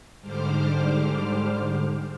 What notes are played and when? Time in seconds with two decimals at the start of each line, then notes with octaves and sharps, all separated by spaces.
0.21 G#2 D3 G3 C5 D6 F6